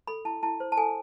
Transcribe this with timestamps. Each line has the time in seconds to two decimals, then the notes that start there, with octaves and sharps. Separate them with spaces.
0.07 A4 B5
0.25 E4 A5
0.43 E4 A5
0.60 C5
0.72 A5
0.77 A4 G#5